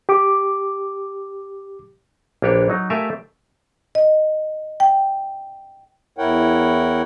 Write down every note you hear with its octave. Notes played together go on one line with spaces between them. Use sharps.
G4 D6
A#1 A#3 D4 G4 B4 C#5
F#3 D#4
A3 G4 A#4 E5 F5 G#5
D#5
G5
E2 E4 A#4 C#5 F#5 G5